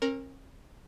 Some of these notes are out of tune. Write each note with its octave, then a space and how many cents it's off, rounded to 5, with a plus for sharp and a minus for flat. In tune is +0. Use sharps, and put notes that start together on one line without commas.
C#4 -45 A#4 +0